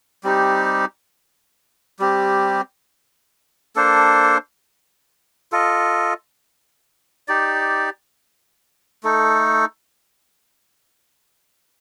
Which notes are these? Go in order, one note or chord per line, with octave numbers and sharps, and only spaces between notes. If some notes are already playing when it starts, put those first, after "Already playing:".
G3 C4 D#4 G4
G3 C4 G4
A#3 D4 A4 C5
F4 A4 D#5
D#4 G4 D5
A3 D#4 A4